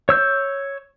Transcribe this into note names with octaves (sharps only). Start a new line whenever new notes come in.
C#5 E6 G6